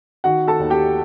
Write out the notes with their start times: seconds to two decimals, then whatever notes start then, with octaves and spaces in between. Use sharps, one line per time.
0.24 D#3 F#4 F#5
0.47 A4 A5
0.60 D#2
0.70 G4 G5